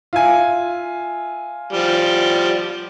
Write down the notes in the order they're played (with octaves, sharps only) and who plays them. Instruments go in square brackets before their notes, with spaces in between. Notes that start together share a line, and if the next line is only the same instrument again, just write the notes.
[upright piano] F4 E5 G#5
[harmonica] F3 G3